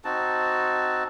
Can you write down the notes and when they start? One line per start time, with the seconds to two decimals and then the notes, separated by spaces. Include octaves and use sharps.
0.05 C4 D#4 F#4 A5